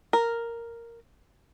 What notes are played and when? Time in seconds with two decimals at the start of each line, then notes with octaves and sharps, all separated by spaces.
0.13 A#4